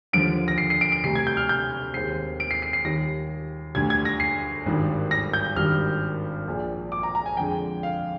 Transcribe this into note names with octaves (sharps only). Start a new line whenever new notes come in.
D#2 D3 F3 D7
A#6
C7
C7
D7
D7
D2 C3 G3 C7
G#6
G6
F6
G6
D#2 D#3 G#3 C4 C7
D7
C7
C7
C7
D#2 D#3 G3 A#6
D2 D3 G3 G#6
G#6
A#6
C7
G#1 G2 D#3 G3
A#6
G6
G#1 G2 D#3 G3 D4 F6
A#1 A#2 G#3
D6
A#5
A#5
G#5
F2 D3 G#3 G5
F5